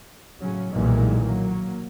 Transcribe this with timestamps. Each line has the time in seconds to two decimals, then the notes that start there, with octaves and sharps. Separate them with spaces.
0.40 A2 C#3 F#3 C#4
0.72 B1 A#2 D#3 E3 G3 G#3
1.23 F#3 A#3